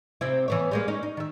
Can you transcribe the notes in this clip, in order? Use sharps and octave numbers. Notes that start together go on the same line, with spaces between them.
C3 C4 E4
E3 B3 C#5
G3 G#3 A#3
C#4 D#4
D#4
D#3 E5